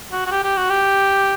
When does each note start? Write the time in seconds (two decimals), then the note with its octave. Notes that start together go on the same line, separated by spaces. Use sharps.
0.12 F#4
0.26 F#4
0.31 G4
0.44 G4
0.57 F#4
0.70 G4